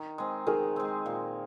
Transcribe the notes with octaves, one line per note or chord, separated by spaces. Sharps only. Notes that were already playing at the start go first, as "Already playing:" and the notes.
Already playing: D#3
G#3 C4
D#3 G#4 A#4
G#3 C4
A#2